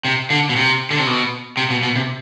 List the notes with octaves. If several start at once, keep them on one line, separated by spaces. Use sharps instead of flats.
C3
D3
B2
C3
D3
C3
B2
C3
B2
B2
C3